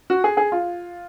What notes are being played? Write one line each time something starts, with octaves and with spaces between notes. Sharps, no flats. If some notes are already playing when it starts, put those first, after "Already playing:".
F#4
G#4
G#4
F4